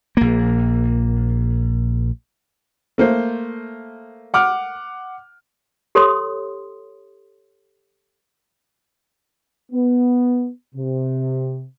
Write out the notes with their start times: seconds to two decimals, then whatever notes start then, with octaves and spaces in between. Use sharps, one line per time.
0.17 A#1 A#3
2.98 A3 A#3 C5
4.34 F#5 D6 F6
5.95 G4 A4 C#5 C6 D#6
9.72 B3
10.75 C3